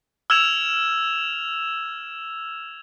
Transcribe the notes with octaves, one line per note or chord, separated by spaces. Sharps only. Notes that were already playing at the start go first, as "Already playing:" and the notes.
E6 F6 G#6 E7 F7